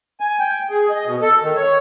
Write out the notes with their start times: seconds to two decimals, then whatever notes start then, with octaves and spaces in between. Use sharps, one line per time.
0.20 G#5
0.39 G5
0.70 G#4
0.90 D#5
1.05 B2
1.22 A4
1.42 D#3
1.56 C#5